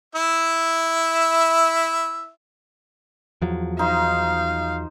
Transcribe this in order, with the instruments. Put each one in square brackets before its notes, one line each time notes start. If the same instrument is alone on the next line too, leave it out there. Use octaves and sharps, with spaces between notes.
[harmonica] E4 E5
[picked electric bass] E2 F3 F#3
[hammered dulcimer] D#4 C5 [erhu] F5